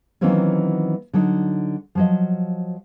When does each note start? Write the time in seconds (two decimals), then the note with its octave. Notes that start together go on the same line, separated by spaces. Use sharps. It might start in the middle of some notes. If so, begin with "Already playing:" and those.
0.21 D#3 E3 F#3 A#3 C4 C#4
1.13 D3 F#3 D#4
1.95 F3 F#3 D#5